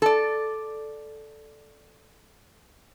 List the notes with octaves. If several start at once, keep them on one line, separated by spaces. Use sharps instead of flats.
A4 D5